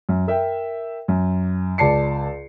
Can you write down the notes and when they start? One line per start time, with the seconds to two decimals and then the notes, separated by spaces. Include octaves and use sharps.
0.09 F#2
0.28 A#4 E5 G5
1.08 F#2
1.78 C#2 D5 A5 C7 C#7